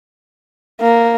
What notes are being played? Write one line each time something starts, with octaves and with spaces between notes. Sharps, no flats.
A#3